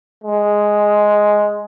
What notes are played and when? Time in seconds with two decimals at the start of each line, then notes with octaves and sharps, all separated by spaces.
0.24 G#3